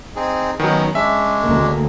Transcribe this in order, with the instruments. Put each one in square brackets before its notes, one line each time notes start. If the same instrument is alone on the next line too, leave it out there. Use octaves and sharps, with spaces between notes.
[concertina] C4 D#4 G#4
[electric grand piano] D#3 F#3 [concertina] B3 C#4 D#4
[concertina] G#3 C#4 D4 [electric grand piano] E5
[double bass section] D2 A#3